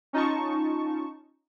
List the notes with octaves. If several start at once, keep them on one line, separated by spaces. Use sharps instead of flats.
C#4 D#4 F4 A5 C#6